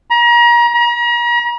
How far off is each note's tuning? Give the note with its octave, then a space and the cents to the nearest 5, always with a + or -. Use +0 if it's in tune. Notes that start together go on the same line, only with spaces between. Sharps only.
A#5 +35
A#5 +40